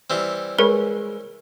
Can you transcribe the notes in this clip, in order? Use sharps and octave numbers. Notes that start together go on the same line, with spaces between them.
E3 G3 C4
G#3 A#4 B4 C#5